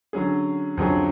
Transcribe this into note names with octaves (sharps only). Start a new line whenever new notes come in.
D3 F#3 C#4 G#4
F2 D3 F#3 C#4 G#4